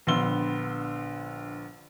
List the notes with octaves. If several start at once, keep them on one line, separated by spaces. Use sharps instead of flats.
A#1 D3 B3 C6 E6 G7